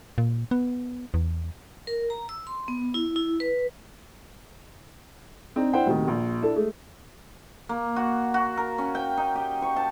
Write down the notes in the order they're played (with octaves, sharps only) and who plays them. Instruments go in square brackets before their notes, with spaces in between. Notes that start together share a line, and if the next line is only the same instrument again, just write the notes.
[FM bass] A#2
B3
E2
[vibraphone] A#4
A#5
E6
C6
B3
E4
E4
B4
[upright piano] C4 D4 D#4
D4 E4 C5 F#5 G5
D#1 D2 C3 D#3
A#1
D4 E4 A4
G#3 A3
[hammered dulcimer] A#3
F#4
F#4
A#4
C#4
G5
D#4
G4
C#6
A5